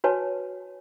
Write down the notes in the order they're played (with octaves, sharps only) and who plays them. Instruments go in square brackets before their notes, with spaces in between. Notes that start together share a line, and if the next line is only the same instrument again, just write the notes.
[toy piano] F#4 B4 C#5 G#5 A5